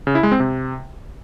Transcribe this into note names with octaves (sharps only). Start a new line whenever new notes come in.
C#3
E4
G#3
C4
C3